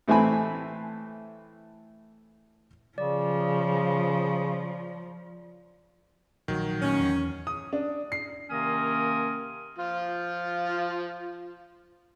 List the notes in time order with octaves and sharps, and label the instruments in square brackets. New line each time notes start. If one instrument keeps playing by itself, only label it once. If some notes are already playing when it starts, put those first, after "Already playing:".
[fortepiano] A2 E3 A3 C4 G#5 B5
[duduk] C#3 [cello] F3 [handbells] D5
[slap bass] A#1 [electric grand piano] D#3 F#3
[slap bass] A#2 A3 [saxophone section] C#4
[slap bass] E2
[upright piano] D#6
D4
C7
[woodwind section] C3 D#3 A#3 C#4 A#4 D#6
[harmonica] F3 F4